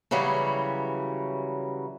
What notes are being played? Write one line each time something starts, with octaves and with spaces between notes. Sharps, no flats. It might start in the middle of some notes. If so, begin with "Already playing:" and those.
C#3 E3 F#3 G3